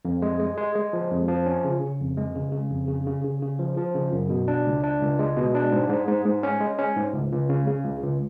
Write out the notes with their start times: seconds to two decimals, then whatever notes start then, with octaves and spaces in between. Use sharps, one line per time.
0.05 F2
0.22 G#3
0.40 G#3
0.57 G#3
0.75 G#3
0.93 F3
1.11 F2
1.28 F3
1.46 C#4
1.65 C#3
1.81 C#3
2.00 F2
2.17 G#3
2.35 C#3
2.52 C#3
2.71 F2
2.88 C#3
3.06 C#3
3.24 C#3
3.42 C#3
3.59 F3
3.77 F3
3.95 C#3
4.12 F#2
4.30 B2
4.48 D4
4.66 C#2
4.84 D4
5.01 C#2
5.19 G#3
5.37 B2
5.55 D4
5.72 G#2
5.89 G#2
6.07 G#2
6.25 G#2
6.43 C#4
6.60 G#3
6.79 C#4
6.96 G#2
7.14 C#2
7.32 C#2
7.49 C#3
7.67 C#3
7.85 C#2
8.03 C#2